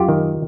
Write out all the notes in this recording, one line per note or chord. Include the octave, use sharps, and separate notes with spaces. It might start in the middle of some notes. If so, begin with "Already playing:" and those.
Already playing: F#2 F4 G4
D#3